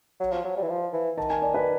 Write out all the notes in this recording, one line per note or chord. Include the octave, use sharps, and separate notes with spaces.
F#3
F3
F#3
G3
E3
F3
E3
D#3 A5
G#5
D5
B4